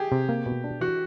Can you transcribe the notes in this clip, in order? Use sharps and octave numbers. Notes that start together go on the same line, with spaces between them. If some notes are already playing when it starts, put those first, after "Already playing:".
Already playing: G4 G#4
C3
A#3
B2
D4
E3 F#4